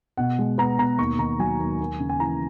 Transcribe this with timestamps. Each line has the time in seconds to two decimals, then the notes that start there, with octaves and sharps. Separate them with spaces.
0.17 B2 F#5
0.38 G#3
0.58 B3 A#5
0.79 B2 A#5
0.98 D#2 C#6
1.19 D#3 A#5
1.39 F#3 G#5
1.59 D#2
1.80 A#3
1.99 C#3
2.09 G#5
2.20 E3 A#5